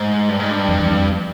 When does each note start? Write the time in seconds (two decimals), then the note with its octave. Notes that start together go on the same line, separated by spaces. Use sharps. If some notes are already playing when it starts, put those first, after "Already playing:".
Already playing: G#2
0.29 G2
0.40 G#2
0.51 G2
0.69 F2
0.80 E2
0.91 F2